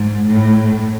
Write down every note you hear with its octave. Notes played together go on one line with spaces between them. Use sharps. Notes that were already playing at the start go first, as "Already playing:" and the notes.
Already playing: G#2
A2